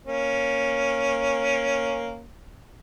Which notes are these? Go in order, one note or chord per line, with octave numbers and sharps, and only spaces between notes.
A#3 C#4